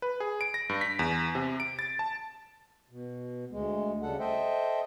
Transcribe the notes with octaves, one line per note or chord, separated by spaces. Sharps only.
B4
G#4
D7
A#6
G2
B6
E2
C3
D7
A6
A5
B2
D2 G#3
D2 C#3 G3 A4 F#5
A4 C5 D#5 E5 G5